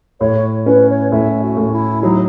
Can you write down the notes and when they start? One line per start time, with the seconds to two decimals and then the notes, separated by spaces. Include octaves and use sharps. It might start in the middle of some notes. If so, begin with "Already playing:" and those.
0.20 A2 C#5
0.66 C#4 B4
0.89 C#5
1.11 A2 E5
1.42 F#4
1.57 A2
1.72 E4
2.02 F#3 D#4